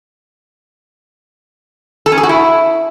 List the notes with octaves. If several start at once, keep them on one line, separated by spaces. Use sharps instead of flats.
A4
C#4
G#4
F#4
E4